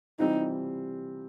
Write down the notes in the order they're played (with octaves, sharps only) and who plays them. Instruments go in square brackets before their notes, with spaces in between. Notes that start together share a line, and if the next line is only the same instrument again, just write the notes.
[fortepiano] C3 E3 G3 C4 F4 [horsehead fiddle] D#4